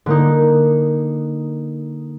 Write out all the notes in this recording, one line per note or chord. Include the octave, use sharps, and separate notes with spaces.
D3 A#3 D#4